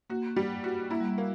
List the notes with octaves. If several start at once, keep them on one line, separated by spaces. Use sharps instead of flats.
A#3 F#4
G3
F#4
A#3 E4
G3
A#3